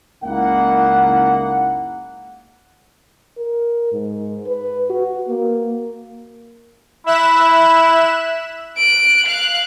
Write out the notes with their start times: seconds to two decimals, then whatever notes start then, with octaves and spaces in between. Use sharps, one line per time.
0.23 F#1 C#2 A#3 D#4 E4 F#5
3.37 A#4
3.92 G#2
4.46 B4
4.90 F#4
5.29 A#3
7.06 E4 E5 F#6 E7
8.77 F#6 D7
9.25 F5 F#6